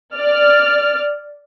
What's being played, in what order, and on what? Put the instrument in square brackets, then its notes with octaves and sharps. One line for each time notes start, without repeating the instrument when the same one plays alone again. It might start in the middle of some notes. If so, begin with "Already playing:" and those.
[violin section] D5 F6